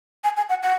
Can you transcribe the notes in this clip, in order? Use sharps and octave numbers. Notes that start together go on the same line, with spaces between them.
G#5
G#5
F#5
F#5